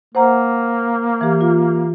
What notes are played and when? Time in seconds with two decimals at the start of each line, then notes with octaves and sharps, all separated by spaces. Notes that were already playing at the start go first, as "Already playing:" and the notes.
0.15 A#3 C5 F#5 A#5
1.21 E3 G4
1.41 F4